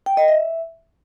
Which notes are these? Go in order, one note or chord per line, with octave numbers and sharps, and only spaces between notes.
G5
D#5
E5